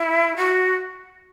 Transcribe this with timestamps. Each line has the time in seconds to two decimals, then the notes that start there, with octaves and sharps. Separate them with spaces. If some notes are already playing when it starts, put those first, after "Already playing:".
Already playing: E4
0.36 F#4